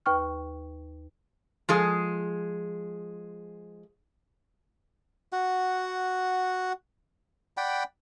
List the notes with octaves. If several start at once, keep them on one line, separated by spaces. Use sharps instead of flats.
D#2 B4 G5 C#6 F6
F3 G#3 G#4
F#4 F#5
D5 F#5 G5 B5